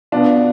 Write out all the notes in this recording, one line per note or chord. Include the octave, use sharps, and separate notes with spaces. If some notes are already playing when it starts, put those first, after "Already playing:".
B2 B3 D4 F4